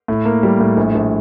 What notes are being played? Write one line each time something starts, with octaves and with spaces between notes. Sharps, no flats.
A2
A#3
G3
A2
A#1
A#1